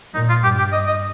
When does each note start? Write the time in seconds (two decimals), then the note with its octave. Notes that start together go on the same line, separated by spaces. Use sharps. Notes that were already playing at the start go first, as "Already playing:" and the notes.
0.15 A#2 D#4
0.29 F4
0.43 G2 G4
0.58 G4
0.72 D#5
0.87 D#5